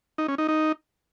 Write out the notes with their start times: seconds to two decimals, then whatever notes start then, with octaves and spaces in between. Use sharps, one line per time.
0.18 D#4
0.28 C#4
0.38 D#4
0.48 D#4